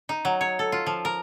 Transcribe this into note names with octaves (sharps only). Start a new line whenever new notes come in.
D#4
F#3
C#5
A4
F4
F3
A#4